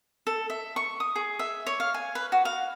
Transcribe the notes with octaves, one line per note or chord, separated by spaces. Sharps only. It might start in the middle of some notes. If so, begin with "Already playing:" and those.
A4
E5
C#6
D#6
G#4
E5
C#5
F5
G#5
B4
F#4
F5